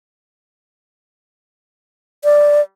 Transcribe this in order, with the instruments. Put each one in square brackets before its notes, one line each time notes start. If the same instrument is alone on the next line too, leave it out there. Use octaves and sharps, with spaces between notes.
[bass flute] D5